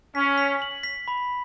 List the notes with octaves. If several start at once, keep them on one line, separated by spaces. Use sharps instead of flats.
C#4 B6
B6
F#7
B6
B5